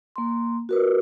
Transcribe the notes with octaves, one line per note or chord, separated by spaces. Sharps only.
A#3 C6
F#4 A#4 B4